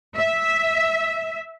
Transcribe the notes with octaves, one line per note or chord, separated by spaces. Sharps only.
E5